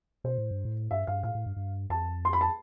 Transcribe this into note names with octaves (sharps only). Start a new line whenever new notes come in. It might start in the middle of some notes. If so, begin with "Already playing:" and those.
B2 C5
A2
G2
A2
G2 E5
G2 F5
A2 F5
A2
G2
G2
F2 A5
C6
B5
A5